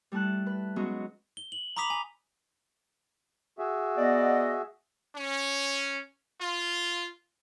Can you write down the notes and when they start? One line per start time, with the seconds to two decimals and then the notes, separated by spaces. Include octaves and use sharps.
0.12 G3 A3 E4 A5 F#6
0.46 B4
0.76 F#3 G#3 B3 C#4 D#4 F#4
1.37 G7
1.52 F#7
1.77 A#5 B5 D6 D#6 B6 F7
1.90 G#5
3.59 F#4 G#4 E5
3.97 B3 D5 D#5
5.15 C#4
6.41 F4